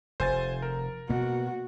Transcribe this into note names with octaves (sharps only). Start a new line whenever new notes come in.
F1 C5 G#5 A6
A#4
B2 A#3 F#4